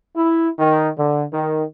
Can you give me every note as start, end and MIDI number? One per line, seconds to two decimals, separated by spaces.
0.16 0.48 64
0.59 0.89 51
0.98 1.24 50
1.34 1.63 51